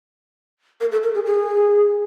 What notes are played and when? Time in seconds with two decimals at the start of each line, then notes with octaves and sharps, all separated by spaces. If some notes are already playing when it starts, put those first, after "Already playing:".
0.81 A#4
0.92 A4
1.03 A#4
1.15 G#4
1.26 G#4